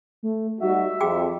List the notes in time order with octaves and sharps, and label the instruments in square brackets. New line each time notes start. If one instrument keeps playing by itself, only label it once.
[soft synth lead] A3
[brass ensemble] G3 D#4 F#4 [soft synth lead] E5
[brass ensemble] F2 [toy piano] F#4 G#4 G5